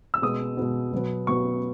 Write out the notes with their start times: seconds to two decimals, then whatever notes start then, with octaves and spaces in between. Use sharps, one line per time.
0.14 E6
0.22 B2 G#3 B3 D#6
0.57 B2 G#3 B3
0.93 B2 F#3 B3
1.27 B2 F#3 B3 C#6